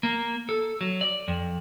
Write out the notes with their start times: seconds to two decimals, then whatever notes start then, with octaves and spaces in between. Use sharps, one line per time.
0.03 A#3
0.49 A4
0.81 F#3
1.01 D5
1.28 F2